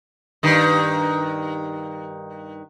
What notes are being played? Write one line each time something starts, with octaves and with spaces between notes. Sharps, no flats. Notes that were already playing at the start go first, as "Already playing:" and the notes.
G2 D#3